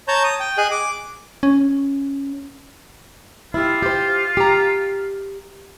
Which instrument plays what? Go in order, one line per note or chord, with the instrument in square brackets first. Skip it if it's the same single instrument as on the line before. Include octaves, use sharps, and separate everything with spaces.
[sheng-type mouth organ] C#5 A5 A#5 G6
D#6
G5
G#4 D#5 G#5 F#6
D6
[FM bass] C#4
[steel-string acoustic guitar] E4 G4 [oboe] F4
[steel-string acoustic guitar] G4 C5
G4 A#5